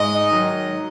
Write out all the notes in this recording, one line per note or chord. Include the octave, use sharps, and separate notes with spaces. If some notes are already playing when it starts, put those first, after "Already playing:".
Already playing: G#2 D#5
D#3 F#3